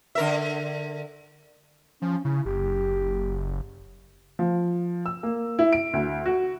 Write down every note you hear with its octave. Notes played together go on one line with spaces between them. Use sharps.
D3 A#4 E5
F3 C#4
C#3 E4
F#1 G4
F3
E6
A#3
E4
D7
D2
F#4